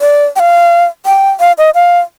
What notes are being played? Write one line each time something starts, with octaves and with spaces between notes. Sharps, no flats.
D5
G5
F5
G5
F5
D#5
F5